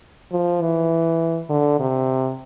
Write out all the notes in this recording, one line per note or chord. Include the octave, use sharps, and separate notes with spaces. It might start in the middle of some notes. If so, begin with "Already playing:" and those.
F3
E3
D3
C3